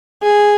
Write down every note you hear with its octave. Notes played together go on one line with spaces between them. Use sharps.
G#4